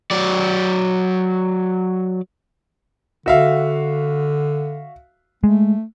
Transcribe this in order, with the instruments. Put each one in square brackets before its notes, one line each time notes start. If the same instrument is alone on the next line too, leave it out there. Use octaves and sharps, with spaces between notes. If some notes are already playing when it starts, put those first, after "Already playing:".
[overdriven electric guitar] F#3 D5
[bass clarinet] D3 [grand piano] F#4 E5 F5
[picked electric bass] G#3 [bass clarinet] A3